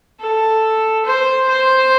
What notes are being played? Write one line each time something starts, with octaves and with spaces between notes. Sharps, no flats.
A4
C5
C5